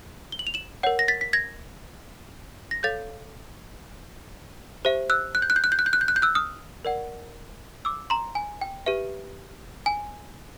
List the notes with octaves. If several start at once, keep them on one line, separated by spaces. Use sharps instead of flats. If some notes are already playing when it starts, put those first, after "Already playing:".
G7
F#7
F7
E7 F#7
A#4 C#5 F#5
A#6
A6 B6
B6
G#6 A#6
A#6
A4 C#5 F5 G6 A6
G4 C5 E5
E6 F#6
F#6
G6
F#6
G6
F#6
G6
F#6
G6
F#6
G6
F#6
G6
E6 F#6
D#6 F6
A#4 D5 F#5
D6 E6
A#5 C6
G#5
G5
G4 B4 E5
G#5